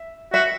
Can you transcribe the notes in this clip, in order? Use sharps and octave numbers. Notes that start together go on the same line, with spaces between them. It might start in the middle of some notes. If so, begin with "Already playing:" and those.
Already playing: E5
F#4 E5